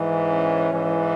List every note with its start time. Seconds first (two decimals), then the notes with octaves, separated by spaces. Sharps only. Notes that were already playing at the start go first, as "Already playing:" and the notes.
Already playing: G#2 E3
0.28 C#4
0.69 G#2 E3